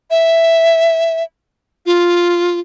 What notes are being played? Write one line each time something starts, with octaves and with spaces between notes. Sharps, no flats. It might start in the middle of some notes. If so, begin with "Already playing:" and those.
E5
F4